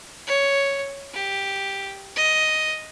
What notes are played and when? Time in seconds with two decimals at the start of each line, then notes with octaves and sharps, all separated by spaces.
0.27 C#5
1.14 G4
2.16 D#5